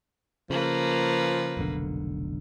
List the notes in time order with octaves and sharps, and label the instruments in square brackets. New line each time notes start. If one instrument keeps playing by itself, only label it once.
[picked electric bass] C#3 [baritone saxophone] F3 [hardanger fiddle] A#3 B4
[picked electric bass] F1 B1 D3